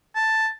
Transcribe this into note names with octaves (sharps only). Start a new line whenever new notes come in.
A5